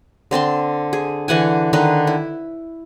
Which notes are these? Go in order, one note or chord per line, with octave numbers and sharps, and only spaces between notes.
D3 C4 A5 C6
G#4
D3 E3 F#5 G#5
D3 D#3 D#4 B4
E4